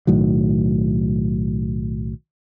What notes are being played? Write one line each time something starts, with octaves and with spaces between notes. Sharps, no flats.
B1 A2 D#3 F#3